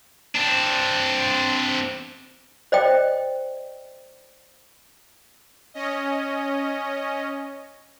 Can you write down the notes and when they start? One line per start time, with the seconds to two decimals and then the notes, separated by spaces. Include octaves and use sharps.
0.35 C4 D4
2.72 C5 D5 D#5 G5
5.74 C#4 D#5